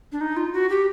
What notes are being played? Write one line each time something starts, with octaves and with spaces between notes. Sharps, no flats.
D4
D#4
F4
F#4
G4